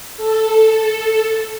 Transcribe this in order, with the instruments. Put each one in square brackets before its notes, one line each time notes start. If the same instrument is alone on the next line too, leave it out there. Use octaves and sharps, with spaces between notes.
[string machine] A4